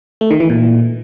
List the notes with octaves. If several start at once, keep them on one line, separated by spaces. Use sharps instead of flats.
A3
D#3
E3
A#2